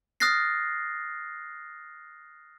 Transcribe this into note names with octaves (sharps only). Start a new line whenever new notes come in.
D#6 F6 F#6 A6 A#6 C7